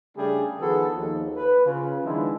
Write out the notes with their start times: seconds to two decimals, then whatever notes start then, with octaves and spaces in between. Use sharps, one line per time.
0.17 C#3 G3 A3 D4 G#4
0.60 D#3 F3 B3 F#4 G#4 A4
0.96 D#2 F3
1.36 B4
1.66 C#3 F4
2.04 D#3 F3 G#3 B3 D4 E4